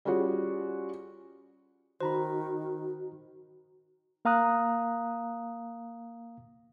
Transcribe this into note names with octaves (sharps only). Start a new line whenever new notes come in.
G3 C#4 F4 F#4 G#4
D#3 F#4 C5 A#5 B5
A#3 F5 A#5 D#6 F#6